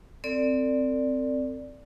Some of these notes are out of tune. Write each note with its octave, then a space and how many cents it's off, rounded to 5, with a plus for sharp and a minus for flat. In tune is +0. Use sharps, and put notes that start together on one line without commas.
C4 -5 A4 +40 D5 +0